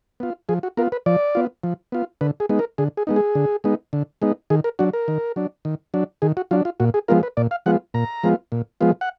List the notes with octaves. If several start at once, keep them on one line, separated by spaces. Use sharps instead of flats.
B3 F4
F3 G#4
F#4
B3 F4 A#4
B4
F3 D5
B3 F4
F3
B3 F4
D3 B4
G#4
G#3 B3 D#4
A#4
D3 G#4
G#4
G#3 B3 D#4
G#4
D3
G#3 B3 D#4
D3
G#3 B3 D#4
D#3 G#4
A#4
F#3 D4 F#4
A#4
D#3
F#3 D4
D#3
F#3 D4
D#3 G#4
F#4
F#3 D4 F4
F4
A#2 F#4
G#4
F3 G#3 B3 F4 A#4
B4
A#2 D5
F5
F3 G#3 B3 F4 F#5
A#2 A#5
F3 G#3 B3 F4
A#2
F3 G#3 B3 F4
F#5